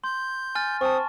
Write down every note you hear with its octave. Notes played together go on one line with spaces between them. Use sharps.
C6 G6
G#5 F6 A6
C4 A5 C#6 D#6